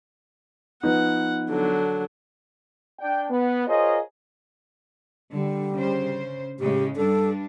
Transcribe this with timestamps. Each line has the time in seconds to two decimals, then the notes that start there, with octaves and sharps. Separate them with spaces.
0.83 F3 B3 D#4 F#5
1.50 D3 F#3
2.99 D4 G5
3.30 B3
3.67 F4 G#4 A#4 C5 C#5 D#5
5.33 D3 G3
5.73 C#3 C5
6.60 A2 C#3 G#3 G4
6.96 G2 G3 D4 A4